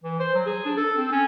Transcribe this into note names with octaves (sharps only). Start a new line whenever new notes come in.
E3
C5
F#3
G#4
D4
A4
C4
C#4